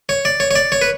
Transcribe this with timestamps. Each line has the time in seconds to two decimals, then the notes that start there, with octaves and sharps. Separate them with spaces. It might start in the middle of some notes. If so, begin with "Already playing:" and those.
0.09 C#5
0.25 D5
0.40 C#5
0.51 C#5
0.55 D5
0.72 C#5
0.82 B4